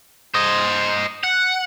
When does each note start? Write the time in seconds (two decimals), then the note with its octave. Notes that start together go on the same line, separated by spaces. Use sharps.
0.34 C5 D#5
1.23 F#5